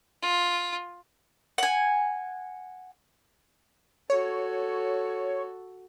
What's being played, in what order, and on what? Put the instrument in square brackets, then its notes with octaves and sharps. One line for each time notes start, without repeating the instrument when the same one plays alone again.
[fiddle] F4
[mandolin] F#5 G#5
[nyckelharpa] F#4 A4 [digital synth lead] C#5